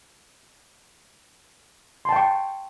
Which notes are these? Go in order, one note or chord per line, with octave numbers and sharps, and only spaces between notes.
G5 A5 C6 C#6